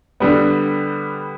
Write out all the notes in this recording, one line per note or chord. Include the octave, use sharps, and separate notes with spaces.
D3 G3 B3